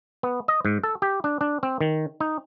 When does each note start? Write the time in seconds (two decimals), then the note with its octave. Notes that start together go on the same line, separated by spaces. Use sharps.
0.23 B3
0.48 D#5
0.65 G#2
0.83 A4
1.02 G4
1.24 D4
1.41 D4
1.63 C4
1.81 D#3
2.20 D#4